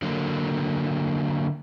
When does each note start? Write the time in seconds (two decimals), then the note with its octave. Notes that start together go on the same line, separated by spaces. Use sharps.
0.02 D3 F#3 A#3